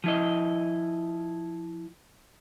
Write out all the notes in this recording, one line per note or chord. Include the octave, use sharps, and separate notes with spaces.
F3 E4 D#5